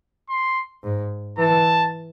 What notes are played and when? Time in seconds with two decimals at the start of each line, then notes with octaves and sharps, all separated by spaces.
0.30 C6
0.84 G#2
1.38 E3 A5